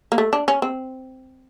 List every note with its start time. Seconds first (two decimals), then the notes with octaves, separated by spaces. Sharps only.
0.12 A#3
0.18 A3
0.33 D4
0.48 C#4
0.62 C4